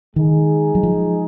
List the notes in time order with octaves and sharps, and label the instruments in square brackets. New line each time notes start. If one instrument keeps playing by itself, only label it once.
[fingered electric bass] D#3 [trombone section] G#3 D#4 G#4
[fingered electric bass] F#3
F3